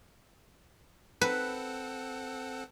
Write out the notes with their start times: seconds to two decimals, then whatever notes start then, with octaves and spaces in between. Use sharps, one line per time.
1.21 C4 A4 B4 F#5